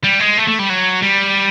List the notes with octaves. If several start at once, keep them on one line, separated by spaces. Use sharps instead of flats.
G3
G#3
A3
A3
G3
F#3
G3